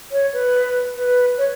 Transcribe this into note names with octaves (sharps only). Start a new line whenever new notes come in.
C#5
B4
B4
C#5